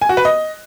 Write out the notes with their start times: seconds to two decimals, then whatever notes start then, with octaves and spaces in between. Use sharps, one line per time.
0.02 G#5
0.09 F#4
0.17 B4
0.25 D#5